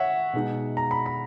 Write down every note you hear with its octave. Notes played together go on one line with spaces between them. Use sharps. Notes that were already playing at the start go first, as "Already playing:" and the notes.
Already playing: C#5 E5 F#5
B2 G#3 D#4
A#5
B5
B5